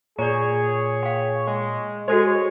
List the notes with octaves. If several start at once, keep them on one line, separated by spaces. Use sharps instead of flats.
A#2 G#4 C#5 D5 A#5
F5 G5
G#3
G#3 F#4 A4 C5 C#5